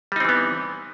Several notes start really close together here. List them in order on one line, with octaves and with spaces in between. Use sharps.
G3 D#4 C4 E3 B3